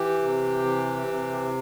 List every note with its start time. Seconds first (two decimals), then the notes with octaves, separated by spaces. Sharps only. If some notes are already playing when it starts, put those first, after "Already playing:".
Already playing: E3 G4
0.22 C3
0.65 E3
1.07 C3